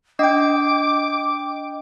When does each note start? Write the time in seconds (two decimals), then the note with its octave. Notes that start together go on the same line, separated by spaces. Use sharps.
0.19 D4 D#5 G5 D6